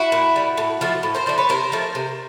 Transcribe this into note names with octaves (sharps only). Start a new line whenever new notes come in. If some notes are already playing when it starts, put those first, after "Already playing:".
Already playing: E4 F#4
A#2
G3
A2
F3 A3
A2
A#4 C5
F3 A3 C5 D5
B4 C#5
C3 A#4 C5
F3 A3
C3